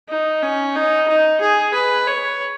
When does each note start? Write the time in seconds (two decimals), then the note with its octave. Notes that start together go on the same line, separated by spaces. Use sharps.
0.09 D#4
0.43 C#4
0.76 D#4
1.08 D#4
1.41 G#4
1.74 B4
2.08 C#5